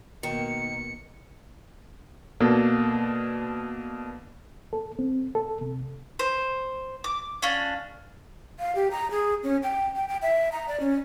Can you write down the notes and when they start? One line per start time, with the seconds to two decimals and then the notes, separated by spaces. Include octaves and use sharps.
0.23 B2 D#3 A#3 C#7
2.40 B2 A#3 D4 A4
4.73 A4
4.99 C4
5.35 A4
5.61 C3
6.19 C5
7.04 D6
7.42 C#4 D4 F4
8.59 F5
8.75 G4
8.91 A#5
9.11 G#4
9.43 C#4
9.63 G5
9.96 G5
10.08 G5
10.22 E5
10.52 A#5
10.68 D5
10.80 C#4